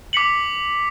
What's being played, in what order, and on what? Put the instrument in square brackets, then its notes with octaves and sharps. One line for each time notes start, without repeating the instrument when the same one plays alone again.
[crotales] D6 B6 C#7 F#7